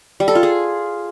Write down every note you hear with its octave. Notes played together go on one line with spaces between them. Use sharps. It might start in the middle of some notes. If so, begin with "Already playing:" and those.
G3
A4
F4
G#4